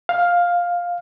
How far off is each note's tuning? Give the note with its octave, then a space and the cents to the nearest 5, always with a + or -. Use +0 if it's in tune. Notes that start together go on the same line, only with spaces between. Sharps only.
F5 +10